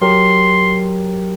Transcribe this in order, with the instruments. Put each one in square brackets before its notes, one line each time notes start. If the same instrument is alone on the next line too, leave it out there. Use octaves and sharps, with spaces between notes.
[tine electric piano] F#3 G4 A#4 [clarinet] C6